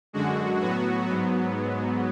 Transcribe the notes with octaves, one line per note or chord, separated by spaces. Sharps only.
F#2 D3 G#3 F#4
A2 F#3 B3 F#4
G#2 F#3 B3